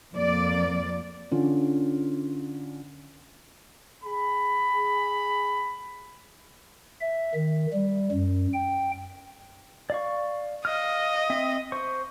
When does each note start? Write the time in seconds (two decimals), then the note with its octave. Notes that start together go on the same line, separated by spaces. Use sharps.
0.14 F2 A#3 D5
1.31 D3 C#4 F4
4.04 G#4 B5
7.01 E5
7.34 D#3
7.73 G3
8.12 F#2
8.53 G5
9.90 D5 F5 C#6
10.65 D#5 F5 F6
11.30 C4 E5
11.72 C5 C#6